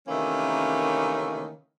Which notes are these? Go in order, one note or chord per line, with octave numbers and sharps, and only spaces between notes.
C3 D#3 E3 A3 A#3 C#4